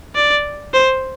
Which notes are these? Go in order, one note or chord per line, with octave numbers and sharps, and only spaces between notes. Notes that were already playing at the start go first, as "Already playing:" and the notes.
D5
C5